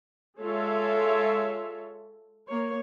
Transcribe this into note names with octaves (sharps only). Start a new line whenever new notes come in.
G#3 F4 A4 C#5 E5
A#3 C#5